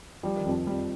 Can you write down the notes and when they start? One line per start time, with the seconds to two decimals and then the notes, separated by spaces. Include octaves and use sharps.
0.23 F3 G3
0.36 D#3
0.45 F2 F3
0.67 F2 G3